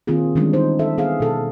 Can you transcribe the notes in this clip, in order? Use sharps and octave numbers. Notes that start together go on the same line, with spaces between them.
D#3 A#3 C4 F4 G#4
D#3 E3 G3 G#3 C#4 D4
D#4 C5
A4 E5
B3 G#4 F5
B2 A4